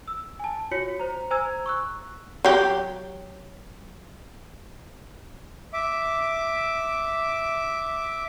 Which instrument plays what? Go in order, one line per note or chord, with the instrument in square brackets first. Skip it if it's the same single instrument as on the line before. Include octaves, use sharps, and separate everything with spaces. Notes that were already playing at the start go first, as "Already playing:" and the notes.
[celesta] E6
G#5 A5
F4 F#4 C#5 C#7
C5 A#5
C5 G#5 A#5 E6 G#6
C#6 E6 F#6
[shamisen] F#3 G4
[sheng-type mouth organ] E5 D6